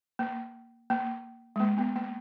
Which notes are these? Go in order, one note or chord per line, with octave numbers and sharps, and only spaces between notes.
A#3
A#3
G#3
A#3
B3
A#3